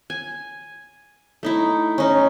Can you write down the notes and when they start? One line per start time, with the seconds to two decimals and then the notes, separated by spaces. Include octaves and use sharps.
0.10 G#5
1.43 A3 D#4 E4
1.98 C#4 D#4